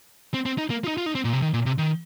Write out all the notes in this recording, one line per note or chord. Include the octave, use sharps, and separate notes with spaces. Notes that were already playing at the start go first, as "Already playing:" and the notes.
C4
C4
D#4
A#3
F4
D#4
F4
D#4
C4
A#2
C3
D#3
A#2
C3
D#3